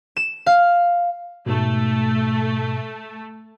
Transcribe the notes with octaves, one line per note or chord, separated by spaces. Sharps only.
E7
F5
G#2 B2 A3